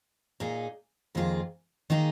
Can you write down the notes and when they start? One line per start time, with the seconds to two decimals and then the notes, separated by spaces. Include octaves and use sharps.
0.40 A#2 A#3 D#4 G#4
1.15 F2 D#3 A#3 F4 G#4
1.90 D#3 A#3 D#4 G#4